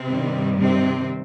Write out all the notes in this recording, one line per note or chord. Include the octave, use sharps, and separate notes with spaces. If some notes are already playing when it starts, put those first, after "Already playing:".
Already playing: C3 C4
G2 D#3 G3
C3 C4